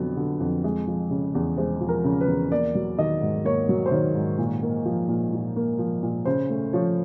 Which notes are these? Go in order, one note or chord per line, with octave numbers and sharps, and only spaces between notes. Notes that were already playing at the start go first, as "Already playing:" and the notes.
Already playing: F2 D3 F#3 B3
D3
F2
G#3
F3
C#3
E2
G#3 C5
F3
A#4
C#3
B4
E2
A#3 D5
F#3
D#3 D#5
G#2
A#3 C#5
F#3
C5
D#3 C#5
G#2
A#2
A#3
F3
A#2
A#2
A#3
F3
A#2
C#3 C5
A3
F3 C#5